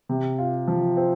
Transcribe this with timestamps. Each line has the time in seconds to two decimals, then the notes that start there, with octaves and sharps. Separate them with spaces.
0.09 C3
0.38 F4
0.68 F3
0.97 C4